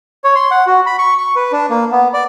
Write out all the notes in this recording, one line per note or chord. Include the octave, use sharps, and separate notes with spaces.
C#5
C6
F#5
F#4
B5
C#6
C#6
B4
D4
A#3
B3
D5